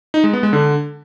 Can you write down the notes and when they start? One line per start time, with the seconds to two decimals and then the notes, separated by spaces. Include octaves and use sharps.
0.14 D#4
0.24 G#3
0.33 B3
0.43 G#3
0.53 D3